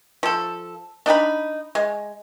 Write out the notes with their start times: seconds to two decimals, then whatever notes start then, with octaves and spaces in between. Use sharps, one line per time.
0.23 F3 A4
1.06 D4 D#4 F#5 B5
1.75 G#3